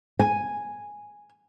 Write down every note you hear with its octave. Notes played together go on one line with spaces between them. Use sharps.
G#5